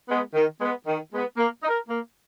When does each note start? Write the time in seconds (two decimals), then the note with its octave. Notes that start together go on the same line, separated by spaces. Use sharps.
0.08 G#3 B3
0.34 D#3
0.60 G#3 B3
0.86 D#3
1.12 G#3 B3
1.37 A#3
1.63 D#4
1.68 A#4
1.88 A#3